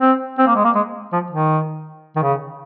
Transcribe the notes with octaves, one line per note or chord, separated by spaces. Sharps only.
C4
C4
A#3
G#3
A#3
G#3
F3
D#3
D#3
C#3